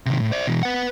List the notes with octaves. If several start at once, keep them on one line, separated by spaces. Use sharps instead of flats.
C3 D#3
A2
C5 D5
B2 E3
B4 F#5